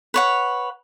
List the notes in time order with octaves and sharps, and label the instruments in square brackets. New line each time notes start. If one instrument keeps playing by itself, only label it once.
[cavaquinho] B4 C#5 F#5